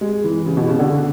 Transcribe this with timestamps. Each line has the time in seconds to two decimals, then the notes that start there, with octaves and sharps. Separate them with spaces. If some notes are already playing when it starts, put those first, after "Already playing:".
0.01 G#3
0.24 E3
0.46 C#3
0.57 B2
0.68 C#3
0.79 D3